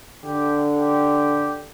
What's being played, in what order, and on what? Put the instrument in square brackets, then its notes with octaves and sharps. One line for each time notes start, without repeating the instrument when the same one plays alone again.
[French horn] D3 [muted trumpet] G4
[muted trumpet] G4